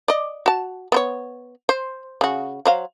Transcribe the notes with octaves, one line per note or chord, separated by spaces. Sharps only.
D5 D#5
F#4 A5
B3 C5 C#5
C5
C#3 F#4
F#3 C5 F5